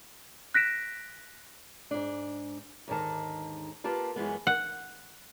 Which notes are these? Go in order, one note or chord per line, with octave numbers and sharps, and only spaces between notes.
F#6 A#6 B6 D7 E7
G#2 D4
D#2 G#2 D3 D#3 A5
A#3 F4 G4 B4 A5
F#2 E3 G#3 B3
F#5